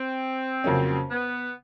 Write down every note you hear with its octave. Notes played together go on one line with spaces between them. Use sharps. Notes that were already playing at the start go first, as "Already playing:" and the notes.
Already playing: C4
F2 C#3 F#3 A#3 C#4
B3